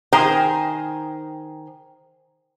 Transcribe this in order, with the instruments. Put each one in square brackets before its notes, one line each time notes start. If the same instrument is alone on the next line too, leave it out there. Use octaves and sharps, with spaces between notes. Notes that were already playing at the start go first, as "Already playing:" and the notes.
[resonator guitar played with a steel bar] D#3 G#4 C5 G5 A#5